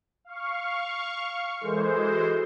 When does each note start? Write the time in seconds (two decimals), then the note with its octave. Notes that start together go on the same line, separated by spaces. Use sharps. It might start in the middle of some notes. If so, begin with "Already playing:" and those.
0.25 F5 C#6
1.61 E3 G#3 A4 A#4 C5
1.96 F#4 A4